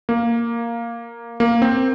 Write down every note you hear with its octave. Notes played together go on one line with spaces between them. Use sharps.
A#3
A#3
C4